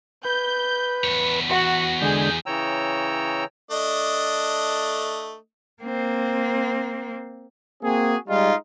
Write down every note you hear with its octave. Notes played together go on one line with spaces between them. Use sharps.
B4 G6
E2 C#5
F#4
D3 G#3 G#4 G6
C#3 E3 C#5 G5 A#5 E6
A3 D4 D#5
A#3 C4
A#3 C4 F#4 G#4
G3 G#3 D#4 F4